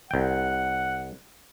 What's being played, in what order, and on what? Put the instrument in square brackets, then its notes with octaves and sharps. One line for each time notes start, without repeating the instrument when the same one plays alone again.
[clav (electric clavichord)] C2 G5 [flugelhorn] F#5